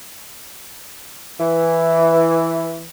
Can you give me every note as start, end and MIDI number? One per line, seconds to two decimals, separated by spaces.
1.40 2.84 52